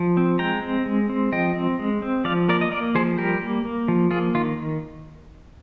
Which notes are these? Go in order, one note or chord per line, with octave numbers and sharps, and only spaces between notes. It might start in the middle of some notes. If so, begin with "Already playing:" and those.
Already playing: F3
C4
G#3 G5 A#5
C4
G#3
C4
F3 D#5 G5
C4
G#3
C4
F3 D5 F5
A#3 A#4 D5
D#5
A#3 A#4 D5
F3 G#4 C5
G3 G4 A#4
A#3
A#3
F3
A#3 F4 G#4
D#3 F4